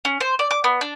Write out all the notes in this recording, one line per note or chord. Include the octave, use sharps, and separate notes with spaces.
C#4
C5
D5
D6
B3
D4